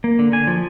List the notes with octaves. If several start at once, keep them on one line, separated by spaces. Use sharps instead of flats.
A#3
D3
D3 G#5
F3